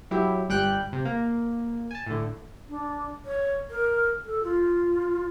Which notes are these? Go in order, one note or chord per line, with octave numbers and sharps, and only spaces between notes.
F#3 E4 G4
G1 G3 G5 F#6
C3
A#3
G#5 A5
A2 D3
D4
C#5
A#4
A4
F4